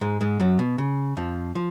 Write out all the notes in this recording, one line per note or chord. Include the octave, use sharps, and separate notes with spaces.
G#2 G#3
G#2 G#3
F#2 F#3
B2
C#3
F2 F3
F3